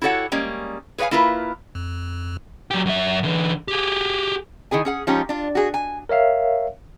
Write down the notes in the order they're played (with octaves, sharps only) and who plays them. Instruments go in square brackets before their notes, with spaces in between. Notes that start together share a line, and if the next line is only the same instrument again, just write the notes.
[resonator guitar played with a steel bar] E4 F#4 G4 A4 C#5 F#5
G3 G#3 A#3 C#4
G#4 B4 C#5 D#5 F5 G#5
A#3 E4 F4 A#4 B4
[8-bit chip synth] F2
[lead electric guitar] F#3 G4
F#2 E5
D3 E3
G4 G#4
[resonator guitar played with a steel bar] D#3 E4 G#4 G#5
C#4 G#4 F#5
F3 G#3 C#4 D#4 F4 G4
D4 F4
F#4 G#4
G#5
[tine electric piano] A#4 C#5 E5 F5